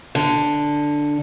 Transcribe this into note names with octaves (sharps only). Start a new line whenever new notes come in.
D3